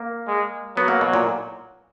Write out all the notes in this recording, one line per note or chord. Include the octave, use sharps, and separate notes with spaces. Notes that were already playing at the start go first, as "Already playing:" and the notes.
Already playing: A#3
G#3
F#3 B3
A#3
B2
A#2